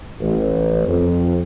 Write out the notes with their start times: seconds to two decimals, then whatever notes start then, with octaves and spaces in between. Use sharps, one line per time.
0.21 A1
0.86 F2